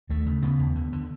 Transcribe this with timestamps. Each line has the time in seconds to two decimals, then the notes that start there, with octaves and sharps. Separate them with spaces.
0.09 D#2 A3
0.26 C#3
0.42 C#3 B3
0.59 D#2
0.75 D3
0.93 D3